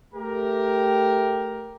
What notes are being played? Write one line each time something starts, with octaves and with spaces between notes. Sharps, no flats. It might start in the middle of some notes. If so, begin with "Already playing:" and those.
A3 G4 A#4